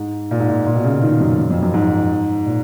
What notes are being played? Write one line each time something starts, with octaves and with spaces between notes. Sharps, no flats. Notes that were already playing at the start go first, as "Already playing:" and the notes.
Already playing: G#2
A#2
G#2
A#2
A#2
B2
C#3
D#3
F#2
F#2
F2
F#2
G#2
A#2